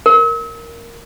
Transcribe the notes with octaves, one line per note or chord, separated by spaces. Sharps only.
A#4